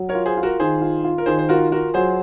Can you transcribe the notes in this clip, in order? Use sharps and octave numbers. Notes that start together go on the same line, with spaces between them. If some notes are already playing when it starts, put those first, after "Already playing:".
Already playing: F#3
A#4 C#5
F4
G#4 C5
F4
F#4 A#4
D#3 G#4 C5
F4
F4
A#4
D#3 G#4 C5
C5
F4 F#4 A#4
F4 F#4 A#4
F#3 G#4 C5